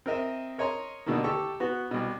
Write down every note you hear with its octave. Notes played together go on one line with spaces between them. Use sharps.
C4 A#4 D#5 E5
A#4 C#5 D#5 A#5 C6
B2 D3 D#3 A3 A#3
G4 A4 C#6
B3 F#4
C2 B2